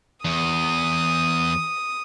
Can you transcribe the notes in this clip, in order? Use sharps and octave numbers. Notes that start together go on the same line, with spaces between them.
E2 D#6